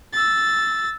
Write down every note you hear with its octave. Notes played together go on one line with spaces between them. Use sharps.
E6 A6